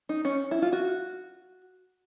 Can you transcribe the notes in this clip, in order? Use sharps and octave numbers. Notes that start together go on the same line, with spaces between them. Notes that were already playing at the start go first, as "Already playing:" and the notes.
D#4
C#4
E4
F4
F#4